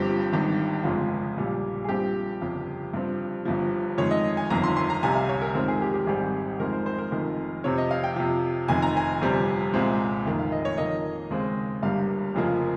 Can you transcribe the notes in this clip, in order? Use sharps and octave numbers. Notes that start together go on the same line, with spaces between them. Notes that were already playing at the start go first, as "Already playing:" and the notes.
Already playing: G1 G2 F3 C4 G4
G#1 G2 D#3
G1 F2 C#3 G#3 F4
A#1 A#2 G3
G#4
G2 F3 C4 G4
G1 F2 C#3
G2 F3 C4
G1 G2 F3
F2 D#3 G#3 C#5
D#5
G#5
G1 F2 D#3 A#5
C6
C6
A#5
C2 C3 G3 G#5
F5
C#5
A#4
F2 D#3 G#3 C4 A#4
G#4
G4
G4
G#1 G#2 G3 C4 G#4
F2 D#3 G#3 C4 A#4
C5
C5
A#4
F1 F2 D#3
F2 C3 F3 C4 C#5
D#5
F5
G5
F2 C3 F3
F1 F2 D#3 G#5
A#5
G#5
G1 F2 C3 G3 C4
C2 A#2 G#3 C4
F1 F2 D#3 A#3
F5
D#5
C#5
F2 D#3 A#3 D#5
D#2 C#3 G#3 C4
G1 G2 G3 A#3 F5
F1 F2 C#3 F3 A#3